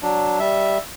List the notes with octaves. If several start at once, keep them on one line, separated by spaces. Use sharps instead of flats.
F#3 D4
G3 E5